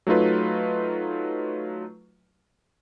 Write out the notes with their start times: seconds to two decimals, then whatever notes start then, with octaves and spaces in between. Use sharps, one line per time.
0.07 F#3 A3 D#4 F4 B4